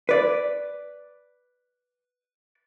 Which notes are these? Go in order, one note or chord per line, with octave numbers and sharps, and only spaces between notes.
B4 D5